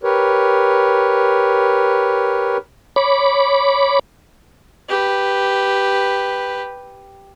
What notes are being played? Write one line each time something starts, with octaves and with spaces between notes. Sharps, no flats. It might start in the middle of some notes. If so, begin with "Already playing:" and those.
G4 A#4 B4 C#5
C#5 B5 D6
G4 B4